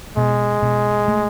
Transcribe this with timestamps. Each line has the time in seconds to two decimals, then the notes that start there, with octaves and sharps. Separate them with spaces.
0.17 B2 G#3
0.62 B2
1.08 A3